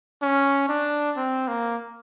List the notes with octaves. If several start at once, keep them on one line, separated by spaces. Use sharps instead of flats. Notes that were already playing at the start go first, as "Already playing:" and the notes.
C#4
D4
C4
A#3